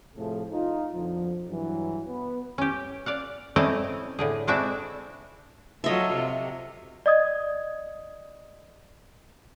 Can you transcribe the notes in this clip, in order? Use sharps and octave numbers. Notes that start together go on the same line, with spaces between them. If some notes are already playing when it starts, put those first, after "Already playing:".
A2 C3 F3 A3 G#4 A4
D#4 F4
F2 B2 D3 F3
G2 E3 F#3
B3 B4
C#4 G4
D5 F5 F#5
A3 C4 C#4 E4 D5 D#5
A2 D3 G#4
G#3 C4 D4 E4 F#4 E5
F#3 F4 A4 D#5 E5
C3
D5 D#5 D#6 G#6